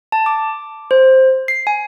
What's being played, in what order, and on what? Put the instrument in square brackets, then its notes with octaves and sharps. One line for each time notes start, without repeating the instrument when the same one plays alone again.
[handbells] A5
D6
C5
C7
G#5